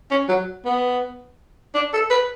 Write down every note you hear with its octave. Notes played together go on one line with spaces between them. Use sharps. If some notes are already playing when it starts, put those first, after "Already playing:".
C#4
F#3
B3
D4
A4
B4